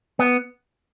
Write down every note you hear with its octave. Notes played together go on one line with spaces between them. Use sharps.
B3